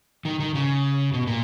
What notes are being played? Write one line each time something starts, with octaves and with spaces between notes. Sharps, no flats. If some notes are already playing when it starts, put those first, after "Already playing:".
D#3
D#3
C#3
B2
A#2